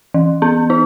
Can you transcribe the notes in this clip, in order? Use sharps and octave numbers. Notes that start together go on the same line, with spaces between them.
E3
B3
D#4